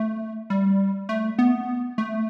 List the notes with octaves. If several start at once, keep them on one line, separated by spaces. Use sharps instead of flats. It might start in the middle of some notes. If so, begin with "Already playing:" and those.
Already playing: A3
G3
A3
B3
A3